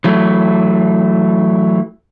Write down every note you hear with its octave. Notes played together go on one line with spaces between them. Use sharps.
E3 F#3 A3